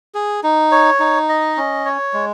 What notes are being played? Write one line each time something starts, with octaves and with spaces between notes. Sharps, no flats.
G#4
D#4
C#5
D#4
D#5
C#4
C#5
G#3